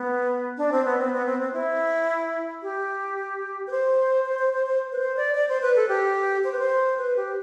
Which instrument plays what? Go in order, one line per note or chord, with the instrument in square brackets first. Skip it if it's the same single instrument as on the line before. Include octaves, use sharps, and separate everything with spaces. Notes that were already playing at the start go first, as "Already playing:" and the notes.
Already playing: [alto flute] B3
D4
C4
B3
C4
B3
C4
C4
E4
G4
B4
C5
C5
C5
C5
C5
B4
C5
D5
D5
C5
B4
A4
G4
C5
B4
C5
B4
G4